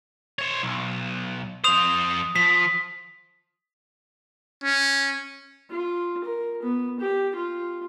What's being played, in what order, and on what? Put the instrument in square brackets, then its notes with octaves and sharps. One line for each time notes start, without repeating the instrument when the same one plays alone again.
[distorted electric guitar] C5 C#5
B1
[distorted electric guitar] F2 C5 [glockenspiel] D#6 F7
[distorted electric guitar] F3 [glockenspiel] B6
[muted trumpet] C#4
[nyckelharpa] F4
A#4
B3
G4
F4